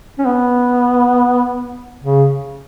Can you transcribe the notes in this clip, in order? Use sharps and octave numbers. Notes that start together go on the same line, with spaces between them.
C#4
B3
C#3